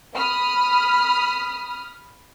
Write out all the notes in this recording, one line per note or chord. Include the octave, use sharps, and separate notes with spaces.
B5 D#6 F6